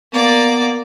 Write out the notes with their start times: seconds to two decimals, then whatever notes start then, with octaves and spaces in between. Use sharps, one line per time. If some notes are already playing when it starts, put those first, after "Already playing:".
0.13 A#3 B3 D5